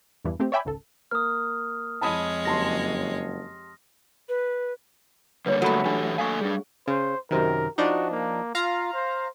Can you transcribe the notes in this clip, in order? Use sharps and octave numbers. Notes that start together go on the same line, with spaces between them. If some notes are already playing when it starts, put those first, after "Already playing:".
E2 G2 E3
A3 C4 G4
C#5 D5 E5 G5 G#5 B5
G#1 C#2 A4
A#3 D#6 F6
F2 G#3 C#5 A5 B5 D#6
F#1 G4 A5 C6 A#6
B4
D3 G3 A#3 B4 C#5
F#3 A3 A4 B5
E3 D4 G4 A4
A#3 A4 F5 G#5 C#6
G3 D4 G#4
C#3 C5
F#2 C3 D#3 A#4
F3 D4 D#4 F#4
A#3
F4 F5 A#5
C5